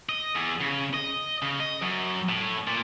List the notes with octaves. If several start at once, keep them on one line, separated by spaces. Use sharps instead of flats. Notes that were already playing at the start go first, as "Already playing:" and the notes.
D#5
E2
C#3
D#5
C#3
D#5
F#2
A2
A#2